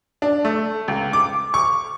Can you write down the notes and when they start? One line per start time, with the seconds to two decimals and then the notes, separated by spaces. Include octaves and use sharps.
0.22 D4
0.45 A3
0.88 C#2
1.13 D6
1.54 C#6